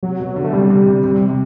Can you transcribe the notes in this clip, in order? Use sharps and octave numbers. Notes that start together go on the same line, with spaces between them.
C3 F#3
B2
D3
A3
C3 G3
C3
C3
C3
C3
C3